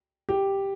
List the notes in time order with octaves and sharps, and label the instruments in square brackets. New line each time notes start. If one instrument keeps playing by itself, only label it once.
[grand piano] G4